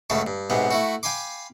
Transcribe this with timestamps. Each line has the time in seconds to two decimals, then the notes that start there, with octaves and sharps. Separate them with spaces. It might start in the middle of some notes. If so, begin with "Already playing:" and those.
0.10 C#2 F#2 C#3 A3 A5 B5
0.27 G2
0.50 B1 G#2 C3 B3
0.71 A3 E4 F#4
1.03 F5 G5 G#5 B5 C6 D6